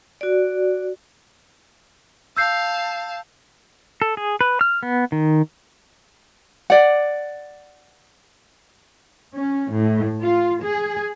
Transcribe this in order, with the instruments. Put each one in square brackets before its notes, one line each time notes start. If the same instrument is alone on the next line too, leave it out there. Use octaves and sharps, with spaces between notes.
[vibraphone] F#4 D5
[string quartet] F5 A5 [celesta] E6 G6 C7
[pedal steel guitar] A4
G#4
B4
F6
B3
D#3
[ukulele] D5 F#5
[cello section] C#4
A2
F4
G#4